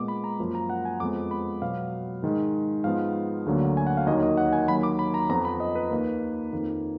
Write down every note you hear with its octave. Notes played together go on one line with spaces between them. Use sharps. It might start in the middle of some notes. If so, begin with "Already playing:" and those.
Already playing: A#2 G#3 B3 D6
B5
A#5
F#2 F3 A#3
A#5
F#5
G#5
F2 F3 G#3 B3 D6
B5
B2 F#3 B3 F5
G#2 D#3 G#3
G#2 F3 B3 F5
D2 D3 F#3 A#3
G#5
F#5
F5
D#2 D#3 F#3 A#3 D#5
D#5
F#5
G#5
D#2 D#3 F#3 A#3 B5
D6
B5
A#5
F2 F3 B3 A#5
B5
D#5
B4
D#2 D#3 A#3
F2 D#3 A#3